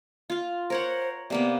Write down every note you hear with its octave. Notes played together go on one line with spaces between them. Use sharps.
F4 F5
A#4 C5 C#5 F#5
C3 A#3 B3 D5